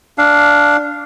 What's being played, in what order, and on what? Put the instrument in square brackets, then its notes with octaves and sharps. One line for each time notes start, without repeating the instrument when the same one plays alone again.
[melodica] D4 F5